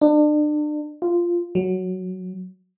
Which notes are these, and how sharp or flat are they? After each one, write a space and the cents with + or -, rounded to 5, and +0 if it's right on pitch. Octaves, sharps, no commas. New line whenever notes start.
D4 +35
F4 -10
F#3 +0